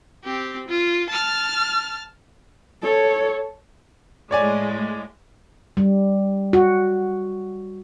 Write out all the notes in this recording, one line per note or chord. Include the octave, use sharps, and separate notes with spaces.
C4 G4
F4
A5 F6
A4 C#5
A2 G#3 C#5 D5 G#5
G3
F#4